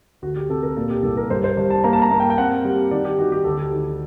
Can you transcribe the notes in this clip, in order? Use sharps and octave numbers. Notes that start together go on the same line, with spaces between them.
D2 F#4
G4
C3 A4
A#4
A#2 A4
G4
C2 A4
A#4
G2 C5
C5
G2
A5
A#3 A#5
A5
A#5
A#3
G5
G5
C4 F#5
G3
D#3 D5
G4
D#3 F#4
G4
D2 A4
G4
D#3